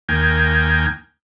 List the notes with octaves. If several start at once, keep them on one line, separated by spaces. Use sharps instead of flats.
D#2 A#3 G5 G#5